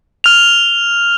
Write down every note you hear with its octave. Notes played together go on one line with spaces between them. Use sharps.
F6 F7